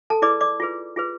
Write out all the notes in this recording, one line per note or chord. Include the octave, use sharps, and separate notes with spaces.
A4 A5
E4 G#4 B4 D5 D6
D5 D6
F4 G#4 B4
F4 G#4 B4